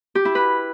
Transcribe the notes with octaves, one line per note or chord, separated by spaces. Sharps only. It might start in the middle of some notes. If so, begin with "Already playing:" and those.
G4
E4
B4